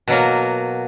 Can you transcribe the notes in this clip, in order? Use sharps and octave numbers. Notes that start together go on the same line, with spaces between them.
B2 F#3 A#3